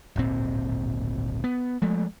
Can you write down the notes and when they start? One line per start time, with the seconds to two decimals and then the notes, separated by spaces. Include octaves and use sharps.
0.16 D1 G#1 A#2 C4
1.44 B3
1.82 F3 G#3 A3